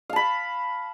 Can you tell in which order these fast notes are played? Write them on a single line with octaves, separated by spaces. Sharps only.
F5 A5 B5